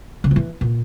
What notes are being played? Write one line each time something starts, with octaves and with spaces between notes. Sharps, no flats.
C#3
F3
E3
A#2